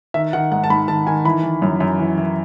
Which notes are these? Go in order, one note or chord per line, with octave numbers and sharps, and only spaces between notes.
D#3 E5
D#3 F#5
G#2 F#5
A5
G#2 B5
D#3 A5
D#3 G#5
E3 B5
E3
F#2
F#2
E3
E3